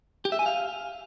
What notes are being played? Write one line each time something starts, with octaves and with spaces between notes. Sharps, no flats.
G4
E5
G#5
F5